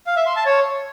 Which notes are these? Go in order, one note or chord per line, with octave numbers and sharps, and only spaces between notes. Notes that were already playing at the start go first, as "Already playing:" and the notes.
F5
E5
C6
A5
C#5